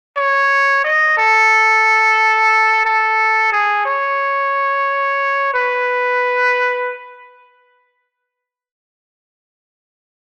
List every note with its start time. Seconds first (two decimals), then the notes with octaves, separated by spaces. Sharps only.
0.17 C#5
0.84 D#5
1.17 A4
2.85 A4
3.53 G#4
3.86 C#5
5.54 B4